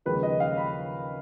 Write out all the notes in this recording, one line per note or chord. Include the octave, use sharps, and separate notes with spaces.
D#2 C#3 F3 G#3 B4
D#5
F5
B5